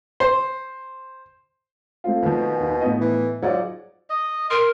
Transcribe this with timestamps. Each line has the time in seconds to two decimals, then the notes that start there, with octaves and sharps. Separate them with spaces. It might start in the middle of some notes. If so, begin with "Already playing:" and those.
0.20 C5
2.04 A3 C4 F4
2.23 B2 D#3 F3
2.56 D#2 G#5
2.81 A2 B3 D#5
3.01 E3
3.43 G#2 F#3 F4 D5 F#5
4.10 D#5
4.50 A#4 C6